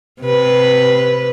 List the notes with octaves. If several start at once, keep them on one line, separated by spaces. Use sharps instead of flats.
C3 B4